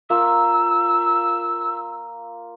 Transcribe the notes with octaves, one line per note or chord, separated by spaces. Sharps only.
A#3 F4 E6